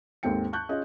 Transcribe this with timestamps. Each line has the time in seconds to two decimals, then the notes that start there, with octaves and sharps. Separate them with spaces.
0.23 D#2 G#2 C4 A4 G5 C#7
0.53 A5 C#6 F#6 G6
0.69 C#4 F4 G#4 D#5